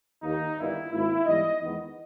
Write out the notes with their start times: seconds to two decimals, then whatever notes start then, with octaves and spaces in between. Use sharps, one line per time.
0.23 D#2 D#3 A#3 D#4
0.57 G1 G2 D#3 A#3 E4
0.91 G#1 G#2 D#3 A#3 E4
1.26 G#2 E3 G3 B3 D#5
1.60 E2 D#3 G#3 B3 D#5